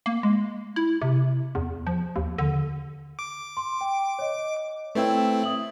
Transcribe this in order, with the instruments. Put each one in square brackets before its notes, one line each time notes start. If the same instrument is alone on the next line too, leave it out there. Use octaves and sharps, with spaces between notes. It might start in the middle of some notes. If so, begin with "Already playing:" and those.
[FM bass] A#3
G#3
E4
C3
E2
F3
D#2
D3
[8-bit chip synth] D6
[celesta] C6
G5
C#5 D#5
[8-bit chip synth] A3 C4 E4 [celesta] B4 C#5 G5
[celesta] E5 D#6 F#7